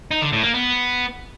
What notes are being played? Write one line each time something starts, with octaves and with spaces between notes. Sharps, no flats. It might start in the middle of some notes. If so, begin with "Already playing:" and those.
D#4
D3
A2
A#3
B3